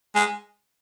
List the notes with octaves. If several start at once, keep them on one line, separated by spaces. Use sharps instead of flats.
G#3